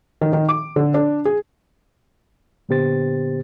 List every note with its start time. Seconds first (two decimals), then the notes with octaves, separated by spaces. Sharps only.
0.21 D#3
0.33 D#3
0.49 D6
0.76 D3
0.94 D4
1.25 G#4
2.69 A#2 D3 B3 G4 C5 A6